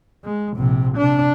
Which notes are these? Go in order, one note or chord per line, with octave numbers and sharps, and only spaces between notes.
G#3
A#1 C3
C3 D4